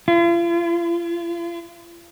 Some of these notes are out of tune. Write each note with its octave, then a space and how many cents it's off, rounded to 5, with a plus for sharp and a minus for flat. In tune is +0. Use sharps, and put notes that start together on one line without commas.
F4 -40